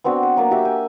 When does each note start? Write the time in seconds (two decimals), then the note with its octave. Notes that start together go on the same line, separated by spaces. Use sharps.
0.04 B3 C4 D4 F#4
0.23 B4
0.37 F#3 A#3 D5
0.51 F#4 G4 E5 G5
0.65 G5 G#5